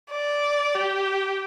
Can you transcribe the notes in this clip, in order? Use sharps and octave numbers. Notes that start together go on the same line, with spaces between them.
D5
G4